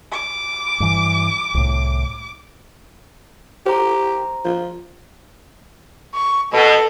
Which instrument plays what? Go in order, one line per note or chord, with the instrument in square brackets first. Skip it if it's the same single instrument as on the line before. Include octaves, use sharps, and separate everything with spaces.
[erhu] D6
[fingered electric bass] G2 E3
C2 A2
[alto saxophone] G4 [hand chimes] C5 A#5
[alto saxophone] F3
[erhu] C#6
[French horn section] B2 [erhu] A4